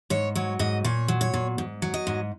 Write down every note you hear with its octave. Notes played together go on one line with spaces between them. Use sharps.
G#2 C#5
F#3 C#5
G#2 D#5
A#2 C#5
F#3
C#5
A#2
G#2
F#3
D#5
G#2